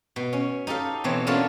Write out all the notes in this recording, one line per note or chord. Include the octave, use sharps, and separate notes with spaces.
B2
C#4
D#4 G4 A4 F5
B2 E3 C4 C#5
C#4 D4 F4 F#4 A4 A#4